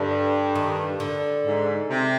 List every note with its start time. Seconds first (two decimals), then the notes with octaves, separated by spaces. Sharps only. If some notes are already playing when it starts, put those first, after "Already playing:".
Already playing: G2 D3
0.55 D#3
1.00 D3
1.45 G#2
1.89 C3